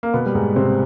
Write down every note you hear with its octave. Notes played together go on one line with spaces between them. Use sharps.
A#3
B2 B3
G3
G#2 G#3
C3 C4